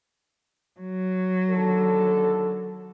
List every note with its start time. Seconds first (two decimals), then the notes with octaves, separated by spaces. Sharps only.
0.80 F#3
1.50 D#2 D3 A4